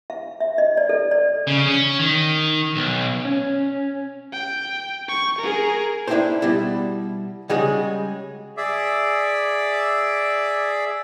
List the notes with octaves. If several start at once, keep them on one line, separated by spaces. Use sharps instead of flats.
F5
E5
D#5
D5
A4
D5
C#3
C#4
D#3
B1
C#4
G5
C#6
G#4 A#4
D4 E4 F#4 G4 A4 C5
B2 G3 E4
C#3 G3 G#3 F#4 G#4 C#5
G#4 D5 E5 D6